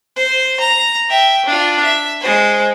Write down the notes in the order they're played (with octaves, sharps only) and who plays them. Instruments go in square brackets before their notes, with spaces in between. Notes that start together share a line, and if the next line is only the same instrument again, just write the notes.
[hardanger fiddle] C5
A#5
E5 G5
D4 F4
E5
G#3 C5